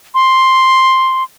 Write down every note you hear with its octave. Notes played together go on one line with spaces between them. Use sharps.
C6